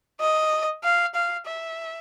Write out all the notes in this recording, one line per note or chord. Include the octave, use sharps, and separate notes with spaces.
D#5
F5
F5
E5